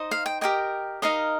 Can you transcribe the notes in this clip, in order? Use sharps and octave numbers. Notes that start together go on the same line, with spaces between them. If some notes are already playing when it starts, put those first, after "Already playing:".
Already playing: D#4 C5 D#5
F5
G5
G4 A#4 D#5 G5
D#4 A#4 D#5 F5